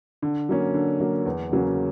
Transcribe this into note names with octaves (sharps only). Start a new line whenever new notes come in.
D3
F#3 A#3 C#4
D3
F#3 A#3 C#4
E2
C#3 F#3 A#3 C#4